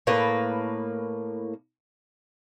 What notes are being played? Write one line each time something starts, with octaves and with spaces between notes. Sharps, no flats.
A2 A#3 B4